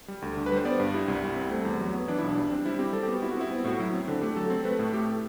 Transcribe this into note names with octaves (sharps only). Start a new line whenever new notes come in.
G3
D2
D3
B4
G3 C5
B3 D5
G2
G3 E4
C2
G3
C4
A3
E2
F#3
B3
E3 D4
B1 E4
D4
G3
C4
G3 E4
C4 G4
G3 A4
B3 G4
F#4
G3 E4
F#4
C4 E4
B3
A2 F#4
F#3 E4
C4
D3
A3 G4
F#3 A4
C4
A3 B4
A2
A3 G4
A4